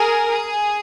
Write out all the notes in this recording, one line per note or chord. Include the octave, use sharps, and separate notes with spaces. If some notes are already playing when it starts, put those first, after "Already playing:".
Already playing: G#4 A#4
G#4